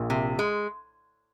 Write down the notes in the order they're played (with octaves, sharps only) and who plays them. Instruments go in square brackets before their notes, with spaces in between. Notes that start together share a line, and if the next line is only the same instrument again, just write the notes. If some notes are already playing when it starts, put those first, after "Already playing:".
Already playing: [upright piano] A#1 A#2
[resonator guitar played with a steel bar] C3
G#3